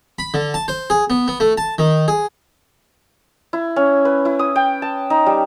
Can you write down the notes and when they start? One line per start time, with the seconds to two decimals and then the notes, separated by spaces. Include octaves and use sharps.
0.19 B5
0.34 D3
0.54 A5
0.68 C5
0.90 G#4
1.10 B3
1.28 B3
1.40 A3
1.58 A5
1.78 D#3
2.08 G#4
3.53 E4
3.76 C#4
4.05 B4
4.25 E4
4.39 D#6
4.56 G5
4.82 A5
5.10 D#4
5.26 G3